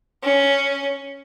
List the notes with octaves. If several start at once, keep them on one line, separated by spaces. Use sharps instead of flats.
C#4